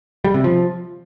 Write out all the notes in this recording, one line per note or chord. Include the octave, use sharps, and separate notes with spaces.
G3
C3
F3